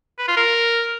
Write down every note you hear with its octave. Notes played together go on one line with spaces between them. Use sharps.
B4
F4
A#4